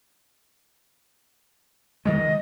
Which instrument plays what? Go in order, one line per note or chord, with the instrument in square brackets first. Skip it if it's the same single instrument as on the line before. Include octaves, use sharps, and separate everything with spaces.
[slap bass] D#3 G3 G#3 [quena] D#5